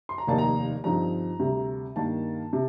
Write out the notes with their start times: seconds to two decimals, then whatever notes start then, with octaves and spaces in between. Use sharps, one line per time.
0.09 C6
0.18 A#5
0.27 F1 D#2 D#3 A#3 D#4 A5
0.38 A#5
0.84 G2 D3 F3 C4 D#4 A#5
1.40 D2 C3 G3
1.96 G2 D#3 A#3 A5
2.53 C3